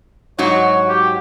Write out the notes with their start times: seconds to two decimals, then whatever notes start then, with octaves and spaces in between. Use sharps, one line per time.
0.39 G#2 F#3 F#4 C#5
0.89 G4